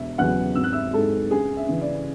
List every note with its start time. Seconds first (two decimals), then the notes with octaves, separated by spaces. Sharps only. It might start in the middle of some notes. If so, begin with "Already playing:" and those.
Already playing: E1 E5
0.18 E2 C#3 F#3 F#5 F#6
0.55 G#1 E6
0.64 F#6
0.73 E5 E6
0.93 G#2 G#3 A4 A5
1.31 C#2 G#4 G#5
1.57 E5
1.69 C#3 E3
1.81 D5